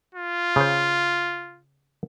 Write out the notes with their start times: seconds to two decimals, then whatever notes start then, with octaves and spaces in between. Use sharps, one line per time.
0.15 F4
0.56 C#3 C5